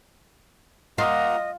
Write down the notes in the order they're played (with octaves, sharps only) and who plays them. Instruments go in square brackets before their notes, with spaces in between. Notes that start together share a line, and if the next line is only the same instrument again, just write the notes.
[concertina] A#3 F#5 A#5 [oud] F4 [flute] D#5